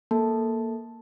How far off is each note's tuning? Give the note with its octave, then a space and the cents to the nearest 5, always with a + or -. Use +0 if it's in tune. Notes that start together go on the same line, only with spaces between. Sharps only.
A#3 +0 A4 +0 A5 +0